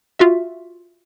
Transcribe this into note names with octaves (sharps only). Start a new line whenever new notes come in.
F4 F#4 E5